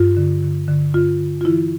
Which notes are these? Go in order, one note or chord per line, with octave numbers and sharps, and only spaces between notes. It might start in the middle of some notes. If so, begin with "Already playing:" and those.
Already playing: G2 F4
D3
D3
D3
G2 F4
D3
F4
E3 E4